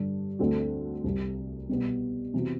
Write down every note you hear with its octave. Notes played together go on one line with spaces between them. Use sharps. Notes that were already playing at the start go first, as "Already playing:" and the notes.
Already playing: G2 D3 G3 D4
D2 D3 A3 C4 F#4
C2 C3 G3
B2 G3 B3
C3 E3 B3 F#4